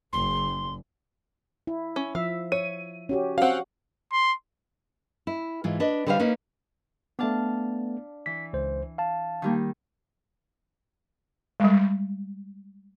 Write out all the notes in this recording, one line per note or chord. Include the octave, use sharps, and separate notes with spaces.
F#1 C6
E4
C#4
F3 E5 F5
C#5 D#7
C#4 F#4 G4
C4 C#4 F#4 F5 F#5
C6
E4
G#2 E3 F4
D4 B4 D#5
D3 G3 B4 C5 D5 F5
A#3 C#4 D#4 B4
A3 B3 D4 F5 A5
E3 B6
C#2 C5
F5 A5
D#3 G3 A#3
G3 G#3